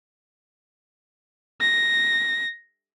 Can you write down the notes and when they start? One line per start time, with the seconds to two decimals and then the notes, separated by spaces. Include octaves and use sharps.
1.61 A#6